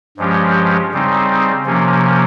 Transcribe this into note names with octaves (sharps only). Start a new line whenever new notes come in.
G2 F3 G#3 C#4 G4
C#3 G3 C4 D#4
C3 F3 A#3 C#4